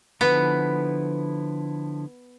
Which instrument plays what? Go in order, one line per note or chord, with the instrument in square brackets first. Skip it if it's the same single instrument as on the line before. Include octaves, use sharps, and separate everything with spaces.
[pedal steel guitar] D3 F3 E4 [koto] B3